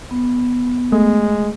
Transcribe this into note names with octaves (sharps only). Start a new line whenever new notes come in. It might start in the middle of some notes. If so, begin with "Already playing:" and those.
B3
G#3 A3